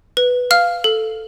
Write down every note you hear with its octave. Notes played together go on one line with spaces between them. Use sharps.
B4
F5 F6
A4